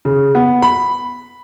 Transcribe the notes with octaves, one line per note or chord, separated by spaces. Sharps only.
C#3
B3
B5